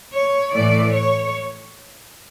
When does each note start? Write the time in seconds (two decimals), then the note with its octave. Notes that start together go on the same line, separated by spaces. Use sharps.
0.15 C#5
0.55 A2 E3 A3 D5
0.95 C#5